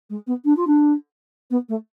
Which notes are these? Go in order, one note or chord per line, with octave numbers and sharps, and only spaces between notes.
G#3
B3
D4
F4
D4
B3
A3